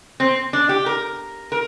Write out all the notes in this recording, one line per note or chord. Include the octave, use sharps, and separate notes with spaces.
C4
D4
G4
A#4
A#4